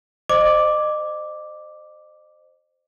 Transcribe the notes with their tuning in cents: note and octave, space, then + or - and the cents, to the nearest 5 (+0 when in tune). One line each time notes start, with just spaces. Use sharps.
C5 +0 D#5 -35 D6 +0